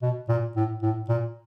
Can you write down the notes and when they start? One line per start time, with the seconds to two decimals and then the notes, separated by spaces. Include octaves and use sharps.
0.02 B2
0.29 A#2
0.56 A2
0.82 A2
1.09 A#2